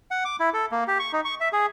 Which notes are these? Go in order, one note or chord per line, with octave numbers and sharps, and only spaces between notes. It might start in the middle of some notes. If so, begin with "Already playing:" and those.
F#5
D6
E4
A4
A#3
G4
C#6
D#4
C#6
E5
G#4